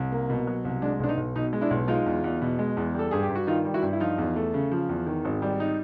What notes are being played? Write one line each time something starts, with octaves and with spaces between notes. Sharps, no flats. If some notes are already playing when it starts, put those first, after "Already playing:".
Already playing: C2
A#3
B2
F#3
C2
G#3 D4
B1 D4
D#4
B1
B2 D#4
G#3
D4 E4
B1
G#3 D#4 F4
E2
E2
B2
G#3
E2
G3 A4
G2 G#4
G4
G2
F#4
D#3 D#4 F4
G3
E4 F#4
G2
E4
F3 D#4 F4
E2
A3
C#3
F3
E2
D#3
G#1
G3
D#4